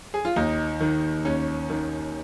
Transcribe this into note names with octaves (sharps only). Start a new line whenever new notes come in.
G#4
F4
D#2 D#4
D#3
D#2 C#4
D#3